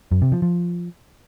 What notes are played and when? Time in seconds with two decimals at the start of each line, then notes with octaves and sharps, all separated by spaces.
0.12 F#2
0.22 C3
0.32 F3
0.42 F3